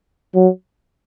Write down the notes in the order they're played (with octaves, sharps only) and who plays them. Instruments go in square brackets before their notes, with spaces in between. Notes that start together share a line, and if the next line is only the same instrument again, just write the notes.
[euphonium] F#3